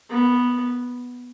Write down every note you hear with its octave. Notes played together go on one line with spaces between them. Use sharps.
B3